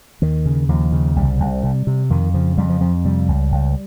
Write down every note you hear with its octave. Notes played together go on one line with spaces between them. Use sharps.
D#2 D#3
C#3
D#2 F3
C#3
C2 G3
C2
C3
C3
F2 D#3
C#3 F3
F2 G3
F3
F2 F3
C3 G3
C#2
C#2